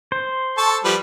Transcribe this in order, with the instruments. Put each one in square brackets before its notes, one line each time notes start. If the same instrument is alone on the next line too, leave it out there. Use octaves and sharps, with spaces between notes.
[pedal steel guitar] C5
[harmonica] A4 A5 C#6
F3 G3 B4